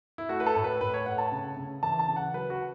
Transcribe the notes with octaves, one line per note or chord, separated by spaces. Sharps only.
E4
A3 F#4
B4
A4
A2
B4
A2 B4
C#5
A2 F#5
A5
C#3
C#3
E3 A5
A5
C#3
F#5
F#3 B4
F#4